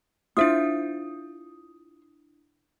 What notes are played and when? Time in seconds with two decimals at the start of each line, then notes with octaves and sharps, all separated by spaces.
0.37 D4 E4 F4 C5 E5 D#6